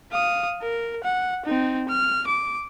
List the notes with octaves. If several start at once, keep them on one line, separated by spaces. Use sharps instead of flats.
F5 D#6
A#4
F#5
C4 D#4
F6
D6